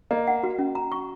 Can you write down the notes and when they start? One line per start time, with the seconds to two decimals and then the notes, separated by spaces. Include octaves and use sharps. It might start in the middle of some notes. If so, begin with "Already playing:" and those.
0.11 A#3 D#5
0.27 F#5
0.43 F#4
0.59 C#4
0.75 A#5
0.92 C#6